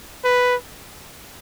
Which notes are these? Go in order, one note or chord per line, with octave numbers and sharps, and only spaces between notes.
B4